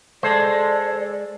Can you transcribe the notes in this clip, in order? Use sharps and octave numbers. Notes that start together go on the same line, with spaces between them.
G#3 A4 C5 D5